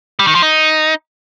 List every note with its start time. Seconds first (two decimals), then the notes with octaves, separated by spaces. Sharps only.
0.19 G3
0.27 D#3
0.35 F3
0.43 D#4